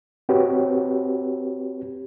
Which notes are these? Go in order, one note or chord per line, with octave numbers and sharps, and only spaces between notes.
C4 F#4 G4 B4 C#5